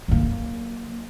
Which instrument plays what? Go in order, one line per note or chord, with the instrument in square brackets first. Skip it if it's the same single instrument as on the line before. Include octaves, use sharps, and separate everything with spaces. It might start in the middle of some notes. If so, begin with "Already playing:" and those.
[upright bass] F#3 A#3